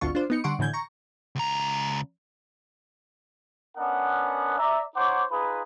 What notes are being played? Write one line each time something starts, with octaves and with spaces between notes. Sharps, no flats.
G#1 D2 D3 F4 C#6
D4 F4 C5
B3 D#4 C#7
D3 G3 F#5 C6 C#6 D7
A2 D3 E3 G6 G#6
A#5 C#6
C#2 A#5
B3 C#4 D4 A#4 D#5 F#5
D5 E5 A#5
D#4 C5 C#5 F#5 D6
D#4 F4 G#4 B4